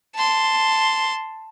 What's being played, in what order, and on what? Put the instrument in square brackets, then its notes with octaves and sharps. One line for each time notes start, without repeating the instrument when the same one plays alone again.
[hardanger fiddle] A5 C6